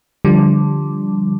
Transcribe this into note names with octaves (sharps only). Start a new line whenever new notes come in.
D3 F3 G3